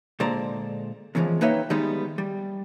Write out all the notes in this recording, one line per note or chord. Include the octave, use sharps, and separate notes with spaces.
A#2 D3 G#3 C5 D5 A#5
E2 C#3 E3 F3 G#3
A#3 D#4 B4 C#5 E5 G5
D#3 G3 G#3 B3 D#4
G3